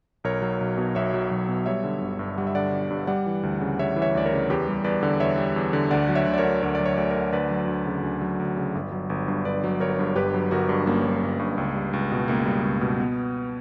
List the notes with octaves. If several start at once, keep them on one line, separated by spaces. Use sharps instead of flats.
B1 A#4 C#5
F#3
B1
B2
B1 C#5 E5
F#3
B1
B2
G3 C#5 E5
D3
G1
G2
G3 F#5
E5
D3 D5 F#5
G1
G2
G3 D5 F#5
E3
D2
C#3
G3 C#5 E5
E3
C#5 E5
D2 D5
A#4 C#5
C#3
E2 G4 B4
G3
E2 B4 D5
D3
E2 C#5 E5
G3
E2
D3
D2 D5 F#5
F#3
C#5 E5
D2
D5
A#4 C#5
D3
D2 C#5
D5
F#3
C#5
D2 D5
A#4 C#5
D3
D2 B4 D5
F#3
D2
C#3
D2
F#3
D2
C#3
G1
F#3
G1
G2
G1 B4 D5
F#3
G1 A#4 C#5
G2
G1 G4 B4
F#3
G1 F#4 A#4
G2
G1 A#3 C#4
F#3
G1
G2
C#2
G3
C#2
B2
C#2 A#3
G3
C#2
B2
B3